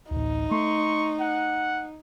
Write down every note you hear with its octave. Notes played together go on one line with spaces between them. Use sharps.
A1 D2 D#4
A3 C6 C#6
F#5